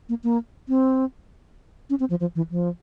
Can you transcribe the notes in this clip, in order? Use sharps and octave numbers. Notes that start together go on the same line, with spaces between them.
A#3
A#3
C4
C#4
C4
F3
F3
E3
F3